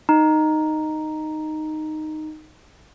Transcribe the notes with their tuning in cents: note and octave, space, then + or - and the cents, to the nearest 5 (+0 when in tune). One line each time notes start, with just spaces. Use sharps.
D#4 -5